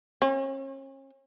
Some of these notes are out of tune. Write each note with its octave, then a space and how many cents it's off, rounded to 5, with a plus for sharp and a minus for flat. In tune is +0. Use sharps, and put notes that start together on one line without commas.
C#4 -40